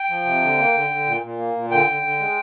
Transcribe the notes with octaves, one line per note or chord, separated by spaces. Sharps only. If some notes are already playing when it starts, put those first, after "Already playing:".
Already playing: G5
F3
C3
D3
A#3
D3
D3
A#2
A#2
A#3
A#2
D3 G5
D3
D3
G#3